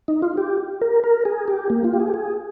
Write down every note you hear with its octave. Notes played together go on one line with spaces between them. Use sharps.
D#4
F4
G4
A#4
A#4
G#4
G4
A#3
F4
G4
G#4
G4
G#4